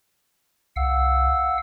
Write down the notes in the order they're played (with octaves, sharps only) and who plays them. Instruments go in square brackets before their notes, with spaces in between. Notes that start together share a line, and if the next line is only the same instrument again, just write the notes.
[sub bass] C2 [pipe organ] F5 F#5 E6